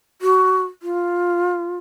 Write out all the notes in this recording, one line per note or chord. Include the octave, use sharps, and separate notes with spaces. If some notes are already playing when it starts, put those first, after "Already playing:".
F#4
F4